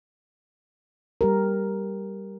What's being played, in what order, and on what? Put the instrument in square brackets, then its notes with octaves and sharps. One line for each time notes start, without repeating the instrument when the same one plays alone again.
[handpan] G3 G4 A#4